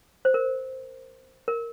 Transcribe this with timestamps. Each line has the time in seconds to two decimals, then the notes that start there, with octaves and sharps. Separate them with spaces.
0.25 C5
0.34 A#4
1.48 A#4